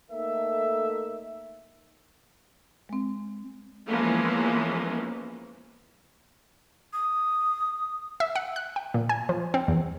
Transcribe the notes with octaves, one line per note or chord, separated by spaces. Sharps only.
A3 A#3 D#4 A4 A#4 E5
G#3 C4
E3 F3 G#3 A#3 B3 C#4
D#6
E5
F#5
F#6
G5
A#2
G#5
F3
C4
E2